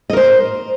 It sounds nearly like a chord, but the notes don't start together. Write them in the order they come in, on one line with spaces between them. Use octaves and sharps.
D#5 A#4 C5